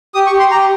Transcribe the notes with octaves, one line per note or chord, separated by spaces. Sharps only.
G4 D#6
C#6
G4
C6
G4 A#5